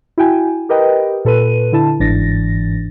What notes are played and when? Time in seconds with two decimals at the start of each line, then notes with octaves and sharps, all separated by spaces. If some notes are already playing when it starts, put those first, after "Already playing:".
0.18 E4 F#4 G5 G#5
0.69 G4 A#4 B4 D#5 G5
1.25 A#2 A4 B4 D#7
1.72 D3 E4 A5
2.00 G1 G#2 E3 D4 A6 A#6